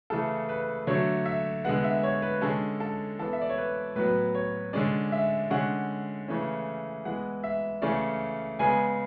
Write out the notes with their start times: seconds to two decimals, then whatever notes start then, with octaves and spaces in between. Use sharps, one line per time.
0.10 C#3 E3 A3 A4
0.49 B4
0.87 D3 F#3 A3 C#5
1.26 E5
1.64 D3 G#3 B3 F#5
1.84 E5
2.03 C#5
2.22 B4
2.41 D3 G#3 C#4 A4
2.80 A4
3.19 E3 B3 A4
3.33 E5
3.41 D5
3.49 C#5
3.58 B4
3.96 A2 F#3 B3 B4
4.35 C#5
4.73 D3 G#3 C#4 D5
5.12 E5
5.50 D3 G#3 C#4 F#5
6.28 C#3 E3 A3 C#4
7.05 E3 G#3 B3 F#5
7.44 E5
7.82 C#3 E3 A3 C#4 D5
8.59 C#3 G#3 B3 G#5